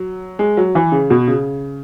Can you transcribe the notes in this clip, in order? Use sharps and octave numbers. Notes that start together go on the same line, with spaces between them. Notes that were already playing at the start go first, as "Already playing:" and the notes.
Already playing: F#3
G#3
F#3
E3
C#3
B2
C#3